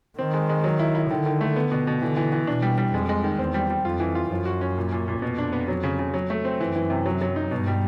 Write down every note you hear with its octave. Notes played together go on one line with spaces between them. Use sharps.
D#3 C4
G#3
G#3
F#3
E4
E4
D3 D#3
D#3
A3
B3
B2
B2
D3 E3
E3
E3
B2 D4
G3
G3
F2 G#3
G#3
D#3
E2 C4
G3
G3
F2 F4
E3
F4
F#2 F3
F#4
C#4
A#2
A#2
A#2
F2 B2
D4
B3
F#3
C#3
C#3
F#3
A3
C4
F#2 E3
E3
C3
F#3
F#3
D#4
G2 B2
G3